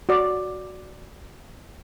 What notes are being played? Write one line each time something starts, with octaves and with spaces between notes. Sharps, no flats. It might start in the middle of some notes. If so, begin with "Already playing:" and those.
F#4 D5